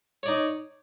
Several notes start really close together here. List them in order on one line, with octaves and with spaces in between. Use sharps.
C#5 D5 D#4